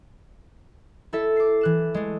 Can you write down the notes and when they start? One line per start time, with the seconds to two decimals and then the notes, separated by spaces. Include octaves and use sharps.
1.13 E4 A4 E5
1.36 D6 C7
1.61 E3 F#6 E7
1.94 G#3 A3